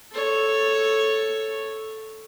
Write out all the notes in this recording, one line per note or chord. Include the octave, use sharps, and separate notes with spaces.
A4 C#5